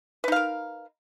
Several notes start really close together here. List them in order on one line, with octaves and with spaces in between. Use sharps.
B4 D#4 F5 A#4